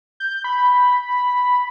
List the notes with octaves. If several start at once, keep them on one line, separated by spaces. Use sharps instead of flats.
G6
B5